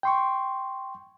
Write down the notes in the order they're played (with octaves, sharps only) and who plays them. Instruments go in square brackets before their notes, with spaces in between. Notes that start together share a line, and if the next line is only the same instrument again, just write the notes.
[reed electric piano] G5 C6 C#6